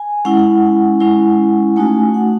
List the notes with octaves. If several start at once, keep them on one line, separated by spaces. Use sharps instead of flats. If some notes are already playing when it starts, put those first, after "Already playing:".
Already playing: G#5
G#3 C#4 E4 F#5
G#3 C#4 E4
A3 D#4 F#4 G#5
F#5